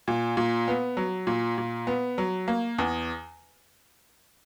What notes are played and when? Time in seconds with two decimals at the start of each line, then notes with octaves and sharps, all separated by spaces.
0.08 A#2
0.37 A#2
0.68 B3
0.97 F#3
1.27 A#2
1.58 A#2
1.87 B3
2.18 F#3
2.48 A#3
2.79 E2